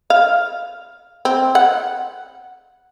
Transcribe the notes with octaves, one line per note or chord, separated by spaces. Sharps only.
F5
C4
F#5